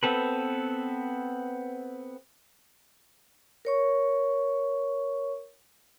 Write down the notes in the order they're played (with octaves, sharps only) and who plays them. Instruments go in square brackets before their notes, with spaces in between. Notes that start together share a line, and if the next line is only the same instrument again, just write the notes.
[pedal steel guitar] B3 C4 A4 B4
[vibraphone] A#4 C#5 C#6